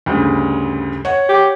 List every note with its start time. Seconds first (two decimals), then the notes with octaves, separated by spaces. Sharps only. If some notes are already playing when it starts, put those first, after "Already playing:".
0.06 D2 G2 C#3
1.05 C#5 F#5
1.29 G4